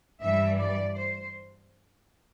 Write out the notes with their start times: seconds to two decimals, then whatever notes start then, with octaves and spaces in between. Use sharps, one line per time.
0.22 G2 E3 G3 E5
0.59 D5
0.96 C5